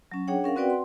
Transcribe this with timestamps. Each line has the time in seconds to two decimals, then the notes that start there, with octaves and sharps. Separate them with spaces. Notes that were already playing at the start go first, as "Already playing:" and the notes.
0.12 F#3 C#4
0.27 D4 G#4 C#5 F#5 G5
0.44 C#4 A#4 F5 F#5
0.56 C4 F#4 B4 D5 F#5 G5
0.70 C6